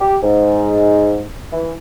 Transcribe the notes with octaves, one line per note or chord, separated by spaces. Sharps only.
G4
G#2
E3